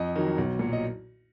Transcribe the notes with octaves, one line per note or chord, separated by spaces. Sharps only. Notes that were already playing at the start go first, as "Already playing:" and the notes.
Already playing: F2 D#5
D#3 F#3
B1
A#2 F#3
D#5